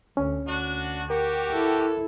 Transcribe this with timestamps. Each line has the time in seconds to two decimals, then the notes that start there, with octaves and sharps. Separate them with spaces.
0.17 D2 C#4
0.47 D2 D4 F#4
1.10 F#4 G4 A#4
1.50 E4 A4